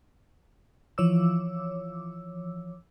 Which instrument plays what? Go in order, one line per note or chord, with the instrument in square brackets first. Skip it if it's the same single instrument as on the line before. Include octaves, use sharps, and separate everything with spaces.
[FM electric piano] E3 F3 C#5 D6 E6